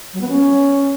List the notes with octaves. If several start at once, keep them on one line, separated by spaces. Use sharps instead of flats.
F#3
B3
C#4